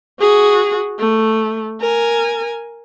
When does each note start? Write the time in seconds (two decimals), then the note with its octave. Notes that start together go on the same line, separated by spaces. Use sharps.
0.20 F#4 G#4
0.99 A3
1.81 A#4 G#5